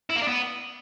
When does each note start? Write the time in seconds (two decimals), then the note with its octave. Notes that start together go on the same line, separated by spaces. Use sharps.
0.10 E4
0.16 A#3
0.22 D4
0.28 B3